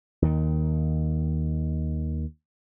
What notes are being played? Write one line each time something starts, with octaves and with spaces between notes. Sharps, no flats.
D#2 D#3